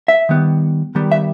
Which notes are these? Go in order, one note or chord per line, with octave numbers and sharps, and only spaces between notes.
E5
D#3 G3 B3
D#3 G3 B3
E5